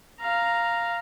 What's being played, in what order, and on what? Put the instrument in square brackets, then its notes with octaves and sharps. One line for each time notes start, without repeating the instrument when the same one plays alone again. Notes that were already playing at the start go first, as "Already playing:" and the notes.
[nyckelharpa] F5 A#5